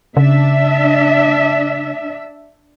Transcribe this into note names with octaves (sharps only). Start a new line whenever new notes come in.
C#3 D4 E5